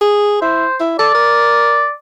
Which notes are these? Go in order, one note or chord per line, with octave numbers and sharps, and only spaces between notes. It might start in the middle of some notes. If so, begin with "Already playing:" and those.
G#4
E4 C5
E4
A4 D5
A#4